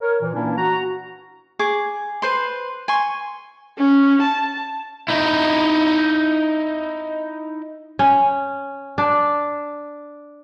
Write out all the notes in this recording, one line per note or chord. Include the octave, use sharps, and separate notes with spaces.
A#4 C#5
A#2 E3
A#2 E3 A#3 C#4 D4 E4
F#4 A#5
G#4 C#6 D6
B4 C5 C6
G#5 C6 C#6
C#4
A5
D#4 E4
C#4
D4